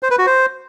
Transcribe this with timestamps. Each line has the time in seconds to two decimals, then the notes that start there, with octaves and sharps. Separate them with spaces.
0.03 C5
0.11 B4
0.19 F#4
0.27 C5